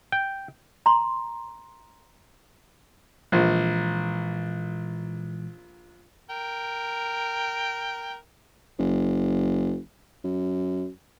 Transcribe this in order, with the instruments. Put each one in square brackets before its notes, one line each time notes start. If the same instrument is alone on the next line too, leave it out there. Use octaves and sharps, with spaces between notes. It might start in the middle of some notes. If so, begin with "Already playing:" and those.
[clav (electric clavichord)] G5
[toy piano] A#5 C6
[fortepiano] A#1 [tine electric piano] A#2 E3 G#3
[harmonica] A#4 G5
[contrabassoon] F#1
F#2